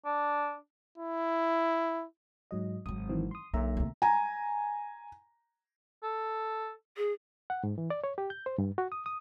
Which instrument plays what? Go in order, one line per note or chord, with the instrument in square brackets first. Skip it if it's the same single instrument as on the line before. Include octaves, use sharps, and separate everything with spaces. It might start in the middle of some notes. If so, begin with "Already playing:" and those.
[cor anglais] D4
[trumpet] E4
[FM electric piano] G#2 F#3 D#5
[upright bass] G#1 F#3 [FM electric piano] D#6
[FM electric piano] D#3 E3 C4
C6 D#6
[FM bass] B1 [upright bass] D3 [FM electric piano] A#3 E5 A#5
[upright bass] D2 C3
[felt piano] G#5 A#5
[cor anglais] A4
[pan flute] G#4
[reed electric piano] F#5
G#2
E3
D5
C#5
G4
G6
C5
G2
F#4
D#6
D#6